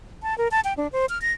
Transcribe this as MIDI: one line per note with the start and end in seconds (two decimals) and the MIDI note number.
0.23 0.37 81
0.38 0.48 70
0.51 0.60 81
0.64 0.73 79
0.77 0.88 62
0.92 1.06 72
1.09 1.21 89
1.22 1.32 94